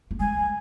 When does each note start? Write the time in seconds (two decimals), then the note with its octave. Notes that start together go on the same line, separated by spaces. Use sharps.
0.11 A#3
0.20 G#3 G#5